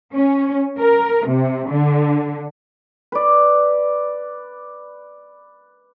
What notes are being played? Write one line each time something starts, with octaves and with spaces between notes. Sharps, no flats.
C#4
A#4
C3
D3
B4 D5